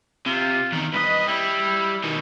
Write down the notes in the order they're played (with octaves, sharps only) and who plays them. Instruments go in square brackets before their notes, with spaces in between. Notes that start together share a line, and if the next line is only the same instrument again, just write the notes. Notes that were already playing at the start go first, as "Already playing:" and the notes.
[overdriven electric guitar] C3 [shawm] F4
[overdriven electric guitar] E2 D#3
[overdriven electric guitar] C2 D#5 [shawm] B4
[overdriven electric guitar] G3 [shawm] E4
[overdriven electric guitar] B2 D#3